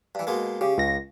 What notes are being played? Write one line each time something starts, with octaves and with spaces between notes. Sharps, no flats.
G2 E3
B2 G#3 A#3
C#3 G4
C#2 A#6